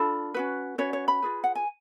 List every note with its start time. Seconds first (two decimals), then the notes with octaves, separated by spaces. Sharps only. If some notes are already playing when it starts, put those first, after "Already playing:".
Already playing: D4 F4 A4 B5
0.34 C#4 F#4 B4
0.78 C#4 F#4 B4 C#5
0.93 C#5
1.08 B5
1.22 F4 G#4 B4
1.44 F#5
1.55 G#5